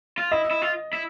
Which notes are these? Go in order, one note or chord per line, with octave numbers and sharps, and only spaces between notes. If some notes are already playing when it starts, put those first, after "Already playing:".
F4
E4 D#5
E4
F4
E4